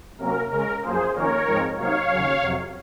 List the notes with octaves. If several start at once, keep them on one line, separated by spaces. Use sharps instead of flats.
C3 F#3 A#3 C#4 A#4
C#3 G#3 C#4 A#4
F#2 F3 A#3 G#4 C5
F2 D#3 A#3 C#4 A#4 C#5
G#2 F3 G#3 C4 D#4
C3 F#3 A#3 D#4 C#5 F5
D#2 C#3 F#3 C#4
F2 C3 F#3